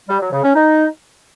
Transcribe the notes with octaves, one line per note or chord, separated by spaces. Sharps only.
G3
F#3
C#3
C#4
D#4